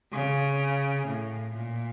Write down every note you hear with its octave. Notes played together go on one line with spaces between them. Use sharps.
C#3
A2
A#2